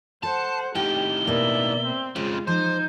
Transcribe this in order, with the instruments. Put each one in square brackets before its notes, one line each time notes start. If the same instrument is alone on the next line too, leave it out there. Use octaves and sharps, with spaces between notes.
[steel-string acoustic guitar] A4 [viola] C5 F#5 [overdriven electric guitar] A5
[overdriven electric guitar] A2 D#3 [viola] G4 [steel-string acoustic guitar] G5 [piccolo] G7
[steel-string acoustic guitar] B2 A#3 [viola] D5 E5
[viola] C4
[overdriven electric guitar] F2 C#3 [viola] G#3 F4 [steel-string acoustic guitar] C4
[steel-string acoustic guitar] F3 [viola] D#4 [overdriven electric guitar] C5 [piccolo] G6